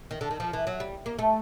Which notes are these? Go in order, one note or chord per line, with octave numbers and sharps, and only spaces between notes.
D#3
D3
D#3
F3
E3
F#3
G3
A#3
A3